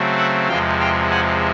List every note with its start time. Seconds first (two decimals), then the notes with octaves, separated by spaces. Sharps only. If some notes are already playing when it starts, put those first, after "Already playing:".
Already playing: C#3 F#3 A3 C4
0.17 E5 F#5
0.48 E2 C3 F3 G#3 F5 G5
0.79 F5 G5
1.11 F#5 G#5